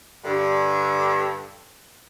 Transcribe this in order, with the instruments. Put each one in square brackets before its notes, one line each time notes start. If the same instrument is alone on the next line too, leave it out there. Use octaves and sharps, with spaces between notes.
[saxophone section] G2 D3